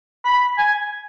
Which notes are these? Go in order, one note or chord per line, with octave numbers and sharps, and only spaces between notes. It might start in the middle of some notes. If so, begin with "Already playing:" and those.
B5
G#5